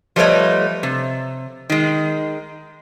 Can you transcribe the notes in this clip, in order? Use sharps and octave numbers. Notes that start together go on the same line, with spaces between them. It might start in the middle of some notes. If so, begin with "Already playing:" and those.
F3 G3 A3 B4 C#5 D#5
C3
D#3 G#3